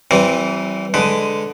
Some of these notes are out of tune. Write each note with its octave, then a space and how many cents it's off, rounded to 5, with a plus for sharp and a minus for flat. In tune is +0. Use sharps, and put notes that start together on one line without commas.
E3 +0 G3 -40 C4 +0
D3 +0 G#3 +0 B4 +20